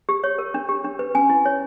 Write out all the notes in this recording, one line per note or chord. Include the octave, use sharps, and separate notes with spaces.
G4
C#5
A#4
D4
G4
D4
B4
C#4 G#5
E4
C#5